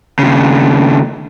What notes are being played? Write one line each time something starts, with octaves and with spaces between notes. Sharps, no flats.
D#2 C#3